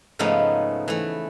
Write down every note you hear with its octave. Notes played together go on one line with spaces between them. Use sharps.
G#2 C#3 F3 A3 B3 D#4
E3 A3